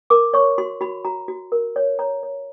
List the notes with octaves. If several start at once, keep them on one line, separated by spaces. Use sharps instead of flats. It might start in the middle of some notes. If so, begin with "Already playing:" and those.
A#4 D6
C#5 C#6
F#4 C6
F#4 B5
F#4 A#5
F#4
A#4
C#5
C#5 A#5
C#5